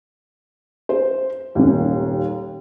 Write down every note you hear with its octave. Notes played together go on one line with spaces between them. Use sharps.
C5
D#1 D#2